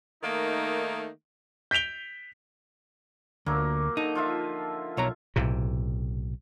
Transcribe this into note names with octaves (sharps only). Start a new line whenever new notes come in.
D#3 A3 A#3 D#4
G6 B6 D7 F7 G7
D2 F#3 A#3
D3 D#4
F3 F4 E5
B1 C#5 A#5
B1 A2 C3